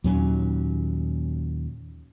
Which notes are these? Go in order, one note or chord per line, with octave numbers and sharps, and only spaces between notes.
D#2 A#2 F#3 C#4